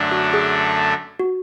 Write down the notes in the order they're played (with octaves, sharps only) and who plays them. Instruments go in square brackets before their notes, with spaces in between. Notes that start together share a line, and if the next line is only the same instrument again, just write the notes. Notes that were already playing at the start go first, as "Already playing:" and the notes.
Already playing: [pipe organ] F#2 D3 A3 D4
[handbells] F#4
G#4
F#4